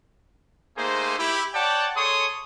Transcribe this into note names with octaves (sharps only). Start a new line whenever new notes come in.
A3 A#3 D#4 G#4 C5
E4 G4
C#5 D5 F#5 G5 A5
G#4 A4 C#5 C6 C#6 D#6